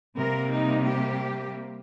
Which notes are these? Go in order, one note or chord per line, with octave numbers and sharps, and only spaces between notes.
C3 G3 A#3 A#4
D#4
G4